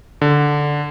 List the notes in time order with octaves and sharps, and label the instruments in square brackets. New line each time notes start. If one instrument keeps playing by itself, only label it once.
[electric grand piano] D3